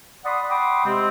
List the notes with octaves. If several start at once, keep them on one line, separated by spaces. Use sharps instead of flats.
D5 F#5 B5 C6 D#6
F#5 G5 B5 C6 D6 D#6
C3 G#3 C4